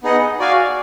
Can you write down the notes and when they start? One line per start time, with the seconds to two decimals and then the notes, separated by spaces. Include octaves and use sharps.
0.03 B3 D#4 G#4 D#5 F#5
0.39 F#4 D5 F5 G#5